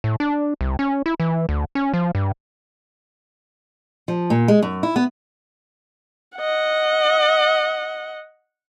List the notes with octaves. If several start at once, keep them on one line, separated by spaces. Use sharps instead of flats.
A2
D4
C2
C#4
E4
E3
D2
C#4
F3
G2
F3
A#2
G#3
F#2
E4
B3
D#5 F#5